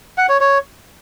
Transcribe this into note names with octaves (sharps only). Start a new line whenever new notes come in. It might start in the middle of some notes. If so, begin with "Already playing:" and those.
F#5
C#5
C#5